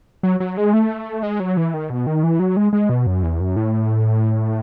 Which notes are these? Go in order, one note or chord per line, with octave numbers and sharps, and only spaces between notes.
F#3
F#3
G#3
A3
G#3
F#3
E3
D#3
B2
D#3
E3
F#3
G#3
G#3
B2
F#2
E2
F#2
A2